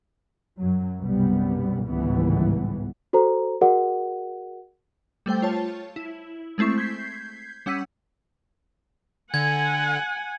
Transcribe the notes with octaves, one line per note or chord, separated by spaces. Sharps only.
F#2 F#3
B1 F#2 C3 G3 B3
G#1 C#2 A2 E3 G3 B3
F#4 A4 C5 A#5
F#4 G#4 A#4 D5 F#5
G3 A3 C5 G5
F4 C#5 A5
E4
G#3 A3 C4 E4 C#6
G6 G#6 B6 C7
G3 C#4 F#5 E6 B6 D#7
D3 F#5 G#5 G#6